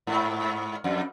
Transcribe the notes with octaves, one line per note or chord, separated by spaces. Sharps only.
G#2
F2